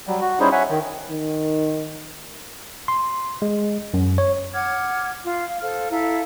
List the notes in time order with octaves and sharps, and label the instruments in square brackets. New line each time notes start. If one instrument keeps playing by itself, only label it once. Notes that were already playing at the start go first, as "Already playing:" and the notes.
[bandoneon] F#3 G3
F#4
G3 C#4 D#4 E4 G#4 C5
C#5 E5 F#5 G#5
D#3
[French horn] D#3
[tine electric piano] C6
G#3
F#2
C#5
[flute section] F#5 D6 F6 G#6
F4
F5
A4 C5 F5 F6
E4 A4 F5 A#5